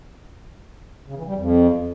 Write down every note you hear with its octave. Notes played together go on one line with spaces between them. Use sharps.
C#3
E3
G3
F2